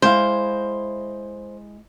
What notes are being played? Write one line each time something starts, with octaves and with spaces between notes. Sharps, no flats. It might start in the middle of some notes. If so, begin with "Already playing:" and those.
G#3 E4 C5 F5